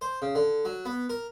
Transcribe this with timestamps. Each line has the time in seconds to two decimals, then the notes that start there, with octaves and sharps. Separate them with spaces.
0.01 C5
0.22 C#3
0.35 D3
0.65 F#3
0.85 B3
1.09 A#4